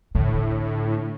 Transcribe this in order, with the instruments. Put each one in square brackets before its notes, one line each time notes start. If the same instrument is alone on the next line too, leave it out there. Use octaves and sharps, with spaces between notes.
[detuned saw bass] A2 [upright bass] D3